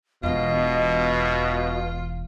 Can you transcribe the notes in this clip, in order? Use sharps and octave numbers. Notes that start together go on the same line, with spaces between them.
E1 E2 B2 F4 D#5